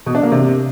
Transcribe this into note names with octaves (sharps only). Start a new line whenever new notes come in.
B2
D4
A#3
C3